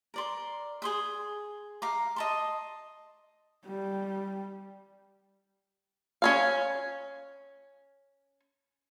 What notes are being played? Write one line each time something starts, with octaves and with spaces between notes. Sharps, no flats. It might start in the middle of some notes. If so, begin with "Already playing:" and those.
A#4 D5 C6
G#4 C6 D#6
F5 A#5 D6
D#5 A5 C6
G3
C#4 C#5 F5